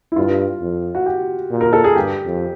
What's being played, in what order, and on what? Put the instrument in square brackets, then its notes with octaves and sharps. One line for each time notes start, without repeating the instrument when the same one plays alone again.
[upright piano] E4
[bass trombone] G2 [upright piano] F4
[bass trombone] F2
[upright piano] F#4
G4
[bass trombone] A#2
[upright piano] A#4
A4
G#4
[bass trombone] G2 [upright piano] G4
[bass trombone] F2